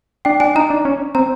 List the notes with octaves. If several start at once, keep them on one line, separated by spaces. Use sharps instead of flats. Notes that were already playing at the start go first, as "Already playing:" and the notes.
D4 G5
D4 G#5
D#4 A#5
D4
C#4
C4 A#5